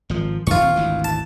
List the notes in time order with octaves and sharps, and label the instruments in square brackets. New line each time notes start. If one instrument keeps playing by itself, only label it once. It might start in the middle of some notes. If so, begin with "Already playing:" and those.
[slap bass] G#1 F3
[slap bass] F2 D3 [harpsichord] F4 C#6
[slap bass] D#1 D#2 C4
G#1 D2 E3
[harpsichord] A5